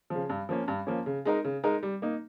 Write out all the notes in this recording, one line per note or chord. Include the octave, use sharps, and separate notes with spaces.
C#3 F3
G2
F3 A#3 C#4
G2
F3 A#3 C#4
C#3
G#3 D#4 A#4
C#3
G#3 D#4 A#4
G3
A#3 D#4